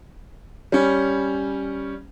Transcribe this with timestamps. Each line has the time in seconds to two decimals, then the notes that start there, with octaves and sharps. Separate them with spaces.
0.72 G3 C#4